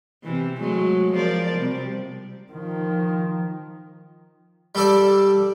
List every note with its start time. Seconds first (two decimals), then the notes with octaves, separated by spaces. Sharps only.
0.23 C3 E3
0.59 F#3 G#3 A3
1.12 F3 A#4 D5
1.55 C3 G3
2.52 D#3 F3
4.75 G3 A4 D5